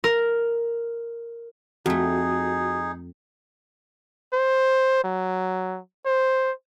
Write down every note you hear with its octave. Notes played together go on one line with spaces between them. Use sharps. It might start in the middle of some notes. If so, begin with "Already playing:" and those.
A#4
F2 A3 D#4 F#4 G#4
C5
F#3
C5